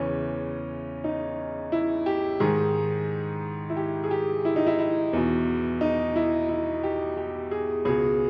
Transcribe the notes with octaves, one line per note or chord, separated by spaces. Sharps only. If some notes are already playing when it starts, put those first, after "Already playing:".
Already playing: E2 C#3 E3 C#4
D#4
E4
G4
G#2 D#3 G#4
E4
G4
G#4
G4
E4
D#4
E4
E4
E2 B2
D#4
E4
E4
G4
G4
G#4
C#2 B2 G#4